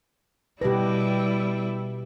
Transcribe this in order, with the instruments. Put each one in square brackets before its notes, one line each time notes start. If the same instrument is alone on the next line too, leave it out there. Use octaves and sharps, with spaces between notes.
[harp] B2 D4 A#6 [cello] G3 E4 [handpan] G4 B4